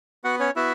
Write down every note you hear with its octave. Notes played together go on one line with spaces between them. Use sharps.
B3 F#4 F#5
C#4 C#5
B3 E4 F#4 E5